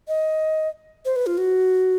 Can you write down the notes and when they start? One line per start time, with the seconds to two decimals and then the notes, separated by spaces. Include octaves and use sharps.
0.08 D#5
1.05 C5
1.16 B4
1.27 F4
1.38 F#4